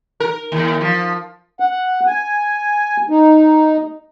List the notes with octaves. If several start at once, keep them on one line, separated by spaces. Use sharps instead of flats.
A#4
D#2
F3
F#5
G#5
D#4